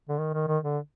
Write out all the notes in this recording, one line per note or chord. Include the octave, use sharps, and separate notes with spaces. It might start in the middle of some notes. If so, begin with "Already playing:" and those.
D3
D#3
D#3
D#3
D3